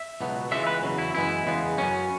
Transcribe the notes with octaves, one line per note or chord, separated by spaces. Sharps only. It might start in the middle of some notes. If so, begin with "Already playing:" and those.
Already playing: E5
C#2 B2 F#3 B3
C#2 C#3 E3 G#3 B3 E5
B4
E2 C#3 F#3
E4
F#2 E3 G#3 B3 E4
E2 C#3 G#3 B3
F#2 F#3 B3 C#4